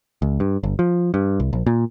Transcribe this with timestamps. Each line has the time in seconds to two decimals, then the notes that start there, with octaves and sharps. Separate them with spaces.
0.22 C#2
0.40 G2
0.63 G1
0.79 F3
1.14 G2
1.40 C2
1.53 A#1
1.66 A#2